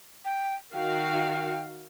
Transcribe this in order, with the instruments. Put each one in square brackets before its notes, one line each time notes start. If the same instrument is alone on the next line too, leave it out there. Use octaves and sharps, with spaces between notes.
[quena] G5
[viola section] D#3 F#4 F5 [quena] G5